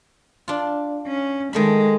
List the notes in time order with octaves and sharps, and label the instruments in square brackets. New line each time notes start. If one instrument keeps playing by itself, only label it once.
[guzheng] D4 F4
[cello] C#4
[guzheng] D#3 A3 B5 [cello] G#3